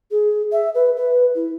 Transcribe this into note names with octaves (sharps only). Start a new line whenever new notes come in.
G#4
E5
B4
B4
E4